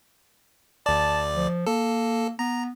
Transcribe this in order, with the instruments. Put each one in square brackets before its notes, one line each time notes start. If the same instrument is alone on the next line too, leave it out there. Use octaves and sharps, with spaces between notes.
[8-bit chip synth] D2 D5 [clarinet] A5
[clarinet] F3
[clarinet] A#3 [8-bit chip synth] A4
[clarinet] B3 [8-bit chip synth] A#5